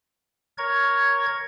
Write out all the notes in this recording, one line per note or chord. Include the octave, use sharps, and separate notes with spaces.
A#4 C#5 G#6